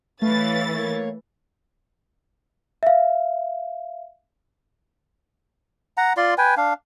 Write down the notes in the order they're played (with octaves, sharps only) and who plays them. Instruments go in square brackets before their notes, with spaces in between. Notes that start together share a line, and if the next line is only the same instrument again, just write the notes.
[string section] E3 A6 [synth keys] A3 [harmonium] B4 C#5 F5
[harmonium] A#3 C#5
[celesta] E5 F5
[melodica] F#5 A#5
F4 D5 C6
B4 G5 G#5
D4 F5